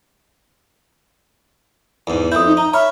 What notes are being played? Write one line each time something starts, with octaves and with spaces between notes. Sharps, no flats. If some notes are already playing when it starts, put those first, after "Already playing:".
E2 G#2
F2 E4 D#6 G6
D#4
D#4 A#5
C#5 E5 B5 F6